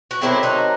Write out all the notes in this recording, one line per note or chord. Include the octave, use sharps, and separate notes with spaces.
F#4
C3 D#3 F#3 A3 C4 E4
D#4 F#4